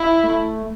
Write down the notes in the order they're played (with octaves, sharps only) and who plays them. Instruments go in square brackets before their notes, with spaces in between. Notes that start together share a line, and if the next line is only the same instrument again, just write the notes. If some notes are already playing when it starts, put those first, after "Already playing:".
Already playing: [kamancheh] E4
[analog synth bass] A3